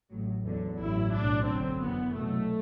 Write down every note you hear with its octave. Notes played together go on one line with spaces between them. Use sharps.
A1 A2 F#3
E2 D3 F#3
A1 G2 F#3 E4
B1 A2 F#3 D4
G1 F#2 D3 F#3 C4
F#2 E3 B3
C2 B2 F#3 A3